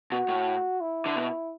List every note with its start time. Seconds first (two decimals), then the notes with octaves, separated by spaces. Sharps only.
0.12 B2 F#4
0.29 A2
0.81 E4
1.06 D3
1.16 B2